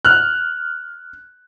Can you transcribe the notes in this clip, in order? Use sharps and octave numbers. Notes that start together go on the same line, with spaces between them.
F6 F#6